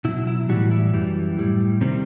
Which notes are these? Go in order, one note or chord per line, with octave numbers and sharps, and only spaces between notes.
B2 F#3 E4
E4
A2 E3 G3 F#4
E4
F#2 E3 G3
A2 G3
C3 D#3 G3 C4